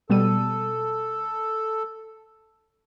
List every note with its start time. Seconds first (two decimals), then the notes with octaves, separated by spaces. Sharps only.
0.10 B2 G3 A4 D#7